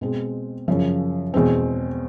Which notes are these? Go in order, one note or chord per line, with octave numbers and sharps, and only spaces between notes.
B2 G#3 C4
F#2 C#3 F3
E2 B2 G#3 C4